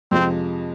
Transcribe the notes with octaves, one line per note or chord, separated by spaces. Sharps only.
F2 C3 F3 G#3 C4